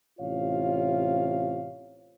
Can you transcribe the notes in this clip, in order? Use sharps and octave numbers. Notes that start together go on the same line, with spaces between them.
A1 C3 F4 C#5 F5